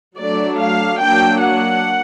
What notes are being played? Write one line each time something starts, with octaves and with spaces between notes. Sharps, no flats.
F#3 A3 D4 D5
F5
F#3 A#3 D4 G5
F#5